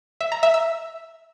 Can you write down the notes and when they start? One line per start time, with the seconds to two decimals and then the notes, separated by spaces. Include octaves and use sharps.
0.21 E5
0.32 A#5
0.43 E5
0.54 E6